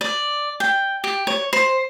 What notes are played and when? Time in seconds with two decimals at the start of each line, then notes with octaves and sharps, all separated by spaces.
0.01 D5
0.60 G5
1.04 G4
1.27 C#5
1.53 C5